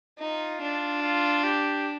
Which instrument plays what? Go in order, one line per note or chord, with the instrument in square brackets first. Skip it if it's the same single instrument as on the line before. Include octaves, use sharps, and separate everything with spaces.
[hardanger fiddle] D#4 [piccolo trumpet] F4
[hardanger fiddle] D4
[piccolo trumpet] F4
G4